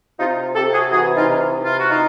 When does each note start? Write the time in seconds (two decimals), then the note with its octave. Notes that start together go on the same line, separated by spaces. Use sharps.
0.19 C3 D#4 F4
0.55 C3 G4 A4
0.73 F#4 G#4
0.91 E3 F#4 G#4
1.16 D#4 F4
1.28 C3
1.64 E3 F4
1.78 F#4
1.91 D#4 F4